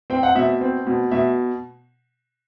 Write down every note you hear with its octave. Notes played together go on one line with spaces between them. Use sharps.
C4 G5
F#5
B2 E5
C4
B2
B2 E5